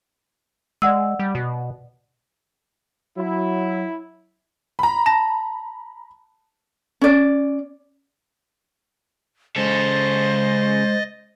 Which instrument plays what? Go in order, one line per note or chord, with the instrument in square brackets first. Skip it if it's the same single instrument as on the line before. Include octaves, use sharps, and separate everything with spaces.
[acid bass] G#3 [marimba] D5 F#5 E6
[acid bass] G3
B2
[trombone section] F#3 [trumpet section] E4
[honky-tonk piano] A#5 B5
[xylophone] A5 A#6
[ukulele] C#4 D5
[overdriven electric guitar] C#3 A4 [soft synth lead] G#3 [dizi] C5 [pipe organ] D#5 A6